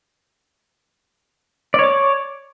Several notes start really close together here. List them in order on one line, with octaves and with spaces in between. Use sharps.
D5 C#5 D6